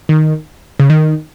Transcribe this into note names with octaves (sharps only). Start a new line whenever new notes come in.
D#3
C#3
D#3